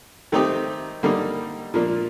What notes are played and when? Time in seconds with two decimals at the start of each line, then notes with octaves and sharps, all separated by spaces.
0.32 D#3 A3 C4 D#4 G4
1.03 D3 G3 A#3 D#4
1.74 A#2 F3 A#3 D4